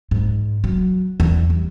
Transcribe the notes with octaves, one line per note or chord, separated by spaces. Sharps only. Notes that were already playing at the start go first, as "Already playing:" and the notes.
G#2
F#3
E2
G3